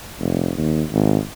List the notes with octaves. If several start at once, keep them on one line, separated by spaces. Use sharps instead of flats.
F1
D#2
G#1